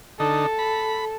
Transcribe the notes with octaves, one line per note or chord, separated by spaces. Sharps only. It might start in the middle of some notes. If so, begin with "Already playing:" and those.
D3 D#4 A4
B5